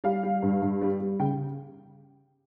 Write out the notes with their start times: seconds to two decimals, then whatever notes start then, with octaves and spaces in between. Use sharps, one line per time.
0.04 G3 F5
0.23 G3
0.42 G2
0.62 G2
0.81 G3
1.00 G3
1.19 C#3 G5